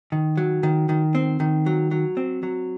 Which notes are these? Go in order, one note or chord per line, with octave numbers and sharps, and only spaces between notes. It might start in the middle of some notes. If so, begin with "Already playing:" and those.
D#3
F#3
D#3
D#3
C4
D#3
F#3
F#3
C4
F#3